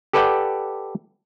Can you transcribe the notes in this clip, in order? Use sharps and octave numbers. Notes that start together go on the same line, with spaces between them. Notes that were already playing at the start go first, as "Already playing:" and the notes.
G4 A4 B4 D5 F#5 G5